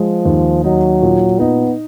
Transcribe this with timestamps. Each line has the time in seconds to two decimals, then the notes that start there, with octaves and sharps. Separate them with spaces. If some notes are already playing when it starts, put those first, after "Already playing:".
Already playing: F3 G#3
0.26 D#2
0.64 F#3 D#4
1.02 A#2
1.39 B3 D#4